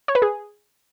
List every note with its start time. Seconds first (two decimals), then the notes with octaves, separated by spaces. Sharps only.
0.08 C#5
0.15 B4
0.22 G#4